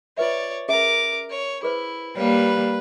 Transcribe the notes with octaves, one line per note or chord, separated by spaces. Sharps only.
F4 B4 C#5 D5 E5
C#4 G#4 A#4 E5 D6
C#5
E4 G#4 B4 C5
G3 A#3 B4 C#5